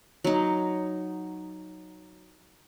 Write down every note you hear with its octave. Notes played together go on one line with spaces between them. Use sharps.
F#3 D#4